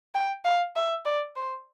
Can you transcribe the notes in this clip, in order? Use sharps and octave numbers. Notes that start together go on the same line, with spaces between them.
G5
F5
E5
D5
C5